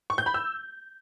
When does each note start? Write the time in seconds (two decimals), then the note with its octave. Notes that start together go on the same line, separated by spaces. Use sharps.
0.10 C#6
0.18 G6
0.26 B5
0.34 E6